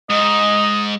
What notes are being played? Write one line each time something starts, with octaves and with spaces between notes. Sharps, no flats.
G#2 D#5